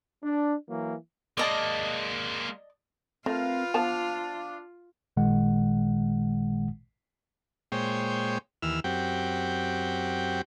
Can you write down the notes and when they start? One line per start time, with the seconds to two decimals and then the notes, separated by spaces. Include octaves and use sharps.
0.23 D4
0.68 E3 F#3 A#3
1.38 G#3 A#3 D5 D#5 A5
3.26 A3 C4 F4 A#4 B4 F5
3.74 F3 B3 D4 F5 A5
5.17 A1 A#2 D#3 G#3 F#5
7.72 A#2 G#3 C5 C#5 G5
8.62 D#2 E3 E6 F6
8.84 F#2 C4 F#4 G4 G5